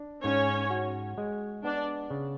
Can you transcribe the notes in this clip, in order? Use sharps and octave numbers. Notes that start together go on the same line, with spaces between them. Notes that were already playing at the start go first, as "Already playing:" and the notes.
Already playing: D4
G#2 C#4 C#5
F#4
G#3
B3 D4 D5
C#3